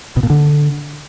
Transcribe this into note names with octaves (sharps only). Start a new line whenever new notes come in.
B2
A#2
D3